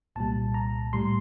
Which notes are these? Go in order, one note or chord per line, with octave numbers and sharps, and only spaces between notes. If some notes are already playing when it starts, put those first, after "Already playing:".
C2 A#2 G3 A5
A#5
A2 G3 C6